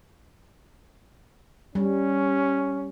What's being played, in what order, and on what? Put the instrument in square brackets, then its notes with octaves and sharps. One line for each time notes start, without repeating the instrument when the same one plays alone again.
[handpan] G3 [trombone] C#4